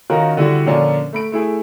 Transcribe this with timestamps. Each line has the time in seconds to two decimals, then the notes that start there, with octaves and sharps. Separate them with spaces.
0.10 D#3 C#4 D#4 F4 F#4 A#4
0.37 D3 G3 E4 F#4
0.66 A#2 D3 F3 A#3 C#4 D4
1.13 A3 B5 D7
1.32 A3 E4 G#4